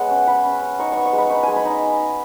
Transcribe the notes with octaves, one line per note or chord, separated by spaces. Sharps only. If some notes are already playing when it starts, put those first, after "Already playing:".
Already playing: G#3 B3 C#5 F#5
C#4
G#3 B5
C#4
C#4
D#4 C#6
B3 C#6
C#6
G#3
B5
D#4 C#6
G#3 G#5
B5
D#4